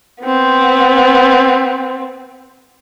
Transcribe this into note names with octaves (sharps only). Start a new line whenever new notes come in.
B3 C4